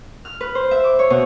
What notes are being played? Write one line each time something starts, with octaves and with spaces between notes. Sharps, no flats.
F6
B4
C5
E5
D6
C#5
B2